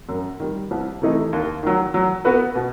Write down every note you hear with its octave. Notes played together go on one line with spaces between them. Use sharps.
F#2
D#3 G3
C2
C3 E3 A3 D#4
D#2
D#3 F#3
F#3
B3 F#4 B4
B2